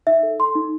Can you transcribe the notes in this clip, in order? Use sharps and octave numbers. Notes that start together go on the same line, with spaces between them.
D#4 E5
A4
A4 C6
D#4